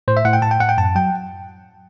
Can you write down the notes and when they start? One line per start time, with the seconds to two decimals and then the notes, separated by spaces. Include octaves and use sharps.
0.08 A2 C5
0.17 E5
0.25 A2 F#5
0.33 G5
0.42 A2 A5
0.51 G5
0.60 A2 F#5
0.69 G5
0.78 F#2 A5
0.95 F#3 G5